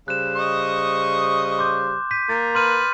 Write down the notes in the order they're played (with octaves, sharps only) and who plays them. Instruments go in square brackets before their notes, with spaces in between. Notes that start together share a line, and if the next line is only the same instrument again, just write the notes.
[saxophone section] C#3 G3 C5 [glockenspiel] F#6 E7
[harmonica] D#5 C#6 D#6
[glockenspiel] C6 D6 G6
G6 B6 D#7
[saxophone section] A#3 A#4 [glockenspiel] A6
[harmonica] B4 [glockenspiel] C6 F6 D#7